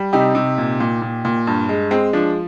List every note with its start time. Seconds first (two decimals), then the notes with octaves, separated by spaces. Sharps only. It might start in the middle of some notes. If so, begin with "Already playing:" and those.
Already playing: G3
0.13 C3 D#4 G4
0.35 C3
0.58 A#2
0.80 A#2
1.02 A#2
1.25 A#2
1.47 G2
1.69 G#3
1.91 G#3 C4
2.13 F3 D4